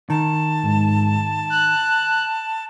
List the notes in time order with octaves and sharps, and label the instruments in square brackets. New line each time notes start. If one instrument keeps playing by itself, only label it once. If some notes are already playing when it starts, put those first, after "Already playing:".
[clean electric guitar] D#3 [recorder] A5
[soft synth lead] G#2
F#6